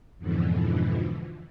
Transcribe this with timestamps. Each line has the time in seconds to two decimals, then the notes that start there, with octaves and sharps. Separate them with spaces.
0.18 F2 G#2 B2 D3 E3 F3